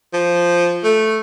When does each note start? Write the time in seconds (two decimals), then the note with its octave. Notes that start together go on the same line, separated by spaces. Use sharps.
0.13 F3
0.83 A3